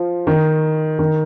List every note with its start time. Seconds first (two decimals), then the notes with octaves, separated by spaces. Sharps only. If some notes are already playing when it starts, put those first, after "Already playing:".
Already playing: F3
0.27 D#3
0.99 D#3